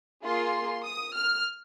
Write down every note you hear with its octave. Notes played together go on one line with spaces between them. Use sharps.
A#3 F4 G#4 C6
D#6
F6